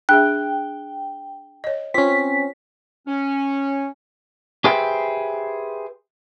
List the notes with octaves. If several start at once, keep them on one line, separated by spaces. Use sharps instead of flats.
D4 G#4 E5 G5 F#6
C#5 D#5
C4 C#4 F4 B6
C#4
G4 G#4 B4 C5 E5 G5